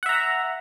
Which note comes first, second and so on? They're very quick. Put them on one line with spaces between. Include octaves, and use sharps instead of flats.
F#5 E5 A#5